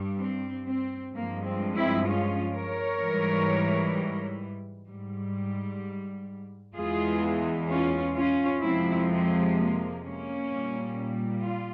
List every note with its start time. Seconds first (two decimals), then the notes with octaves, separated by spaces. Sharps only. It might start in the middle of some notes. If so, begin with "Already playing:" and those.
Already playing: G2 G3
0.20 C4
0.66 C4
1.14 G2 F3 G#3 A#3
1.45 C4
1.75 C4 E4
2.07 C#4 F4
2.54 A#4 C#5
3.00 G#2 E3 G3
4.88 G#2 G3
6.75 E2 E3 G#3 F4 G#4
7.69 C#4 F4
8.16 C#4 F4
8.62 F2 C3 F3 G#3 C4 E4
9.10 C4
9.57 A#3
10.04 A#3 C#4
10.51 A#2 G3
11.43 F4